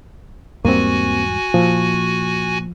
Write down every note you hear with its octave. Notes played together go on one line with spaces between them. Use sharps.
E2 G#2 G3 A#3 C4 F#4 G#5
A#2 F3